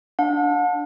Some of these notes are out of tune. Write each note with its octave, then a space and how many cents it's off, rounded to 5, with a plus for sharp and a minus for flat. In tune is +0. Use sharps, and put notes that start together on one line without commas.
D4 +0 F#5 -45